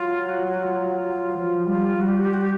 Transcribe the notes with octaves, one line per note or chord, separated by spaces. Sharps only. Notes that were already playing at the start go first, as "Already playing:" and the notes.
Already playing: F#3 F4
F#4
F#4
F4
F3
G3 F4
G3 F#4
G4
F#4
G4
F#4
G4